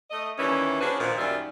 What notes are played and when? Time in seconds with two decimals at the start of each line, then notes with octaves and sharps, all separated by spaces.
0.11 A3 D#5
0.39 D#2 D#3 E3 G3 C#4 E4
0.81 C#4 D4 F#4 G#4 B4 C5
0.98 A#2 D#3 F3
1.18 F#2 D#3 G3 F4 D5 E5